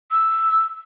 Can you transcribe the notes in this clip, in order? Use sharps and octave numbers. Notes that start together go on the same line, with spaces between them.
E6